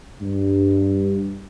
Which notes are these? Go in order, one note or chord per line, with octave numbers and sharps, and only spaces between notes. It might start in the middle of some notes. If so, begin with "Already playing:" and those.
G2